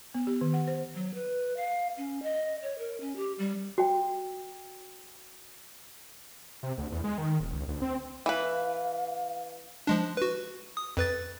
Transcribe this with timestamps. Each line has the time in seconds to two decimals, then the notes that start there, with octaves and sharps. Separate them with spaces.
0.14 B3
0.27 G4
0.41 D#3
0.53 F#5
0.68 C5
0.95 F#3
1.14 B4
1.57 F5
1.97 C#4
2.23 D#5
2.62 C#5
2.78 A#4
3.01 C#4
3.16 G4
3.39 G3
3.78 F#4 G5
6.63 C3
6.78 D2
6.91 E2
7.04 G#3
7.18 D#3
7.40 D#1
7.53 C#2
7.68 D2
7.82 C4
8.26 E3 B4 F5
9.87 F3 G#3 D4
10.17 F#4 B4
10.77 D#6
10.97 F2 B4 A6